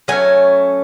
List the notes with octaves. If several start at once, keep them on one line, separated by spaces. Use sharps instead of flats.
F#3 A3 C#4 G#5